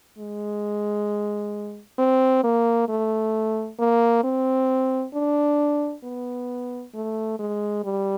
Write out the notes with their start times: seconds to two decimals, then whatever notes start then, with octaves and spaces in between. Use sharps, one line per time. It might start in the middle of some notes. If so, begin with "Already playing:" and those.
0.19 G#3
1.99 C4
2.44 A#3
2.89 A3
3.79 A#3
4.24 C4
5.14 D4
6.04 B3
6.94 A3
7.39 G#3
7.84 G3